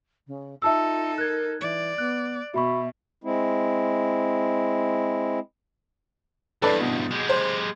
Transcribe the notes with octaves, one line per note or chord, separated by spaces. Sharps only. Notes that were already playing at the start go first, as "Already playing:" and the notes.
C#3
D#4 F4 A4 E5 A5 E6
A#4 F#6 G#6
E3 D5
B3 F#6
B2 F#4 E5 B5 C#6
G#3 C4 E4
E2 G2 A4 B4 D5
B2
G#3 G4
C5